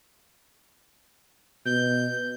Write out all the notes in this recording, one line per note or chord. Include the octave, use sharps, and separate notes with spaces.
B2 G6